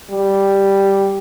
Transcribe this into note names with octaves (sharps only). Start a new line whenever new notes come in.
G3